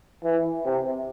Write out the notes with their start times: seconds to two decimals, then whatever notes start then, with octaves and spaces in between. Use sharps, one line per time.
0.24 E3
0.65 C3